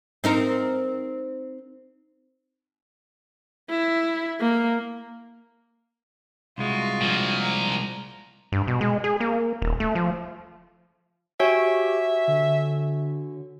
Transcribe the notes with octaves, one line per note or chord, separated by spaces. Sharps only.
C4 D#4 A#4
E4
A#3
C2 G#3 F4 F#4
A#2 F3
A#5
G2
B2
G#3
G#4
A#3
D#1
A3
F3
F#4 G4 C#5 E5 G#5
D3